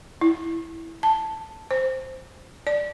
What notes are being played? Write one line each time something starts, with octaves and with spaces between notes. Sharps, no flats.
E4
A5
C5
D5